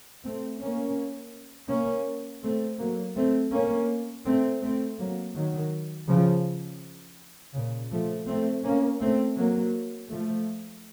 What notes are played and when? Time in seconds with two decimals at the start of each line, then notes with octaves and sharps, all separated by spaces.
0.24 A3 C4
0.60 A#3 C#4
1.70 A#3 C#4
2.43 A3 C4
2.79 F#3 A#3
3.16 A3 C4
3.52 A#3 C#4
4.26 A3 C4
4.62 A3 C4
4.98 F#3 A#3
5.35 D#3 F#3
6.08 C#3 F3
7.54 A#2 C#3
7.91 F3 A3
8.27 A3 C4
8.64 A#3 C#4
9.00 A3 C4
9.37 F#3 A#3
10.10 F3 A3